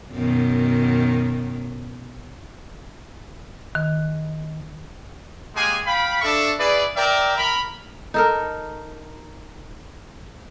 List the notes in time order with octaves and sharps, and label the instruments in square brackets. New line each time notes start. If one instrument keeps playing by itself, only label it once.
[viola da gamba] F#2 B2 D#3
[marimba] D#3
[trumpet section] G#3 A#3 G4 G#4 G#5
F5 G5 B5
D4 A4 E5 A5 C#6
E4 G#4 B4 D5
A#4 D5 E5 G5 A#5
A#4 B5
[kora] D#4 A4 A#4